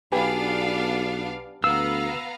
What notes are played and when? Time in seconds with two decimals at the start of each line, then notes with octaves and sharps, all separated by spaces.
0.12 B1 B3 D4 G4 B4 F5 G#5
1.64 D2 B3 F5 A#5 E6